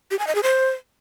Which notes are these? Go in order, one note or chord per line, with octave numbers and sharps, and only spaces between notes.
G4
G#5
D#5
G#4
C5